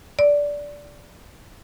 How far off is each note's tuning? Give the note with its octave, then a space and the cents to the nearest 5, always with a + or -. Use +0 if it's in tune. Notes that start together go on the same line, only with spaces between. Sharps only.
D5 -15